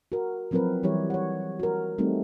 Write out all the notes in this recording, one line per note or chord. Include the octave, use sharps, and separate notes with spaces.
F#4 A#4
F3 F#3 C4 E4 A#4 B4
E3 G3 E4 G4 C#5
C#5 F#5
F#4 A#4
G3 A3 C4 D#4